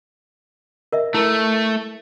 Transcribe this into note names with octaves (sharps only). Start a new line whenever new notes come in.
A#4 D#5 E5
A3 E4 A#4